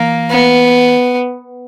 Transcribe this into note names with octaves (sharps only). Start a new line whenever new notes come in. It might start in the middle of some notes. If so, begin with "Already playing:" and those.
Already playing: E3 A#3
B3